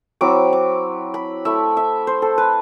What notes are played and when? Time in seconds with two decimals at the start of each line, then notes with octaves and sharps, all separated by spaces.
0.21 F#3 C4 E4 D6
0.53 D6
1.14 B5
1.45 A3 E4 E5
1.77 E5
2.07 C5
2.22 A4
2.38 B4